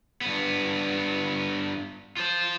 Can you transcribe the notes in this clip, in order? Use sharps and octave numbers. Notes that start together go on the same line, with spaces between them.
G2 B3
F4 C5